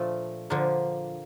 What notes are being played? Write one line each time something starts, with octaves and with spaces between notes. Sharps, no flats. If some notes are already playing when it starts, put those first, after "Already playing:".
Already playing: A#2 F3 A3 D4
D3 F3 A#3 D4